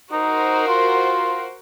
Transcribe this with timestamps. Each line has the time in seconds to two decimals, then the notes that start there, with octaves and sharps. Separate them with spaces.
0.12 D#4 F#4 A#4 C5
0.67 F4